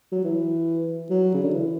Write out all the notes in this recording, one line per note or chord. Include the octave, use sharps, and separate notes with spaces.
F#3
E3
F#3
C#3
D3
E3